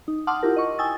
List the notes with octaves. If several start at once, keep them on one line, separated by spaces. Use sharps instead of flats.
D#4
F#5 A5 C6 D6 D#6 F6
E4 F4 G4 A#4
D#5 C#6
G5 G#5 D#6 E6 A6